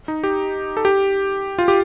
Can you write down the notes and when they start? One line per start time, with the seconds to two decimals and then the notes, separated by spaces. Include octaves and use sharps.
0.08 D#4
0.24 G4
0.77 A4
0.85 G4
1.58 F4
1.68 G4